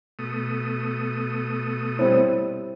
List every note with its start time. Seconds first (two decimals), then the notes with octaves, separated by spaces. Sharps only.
0.19 B2 A3 D#6
1.99 G3 C4 E4 C5 C#5